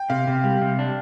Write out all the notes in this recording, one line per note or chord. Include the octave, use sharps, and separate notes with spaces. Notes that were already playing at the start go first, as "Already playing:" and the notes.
Already playing: G5
C3 F5
C3
G3
C3
D4